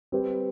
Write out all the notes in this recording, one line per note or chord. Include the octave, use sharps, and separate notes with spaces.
G3 C4 G4 B4